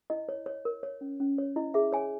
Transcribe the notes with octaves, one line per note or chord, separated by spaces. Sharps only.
E4 D#5
C#5
C#5
A#4
C#5
C#4
C#4
C#5
E4 D#5
G#4 E5
C#5 G#5